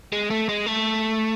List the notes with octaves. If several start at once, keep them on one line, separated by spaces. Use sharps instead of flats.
G#3
A3
G#3
A3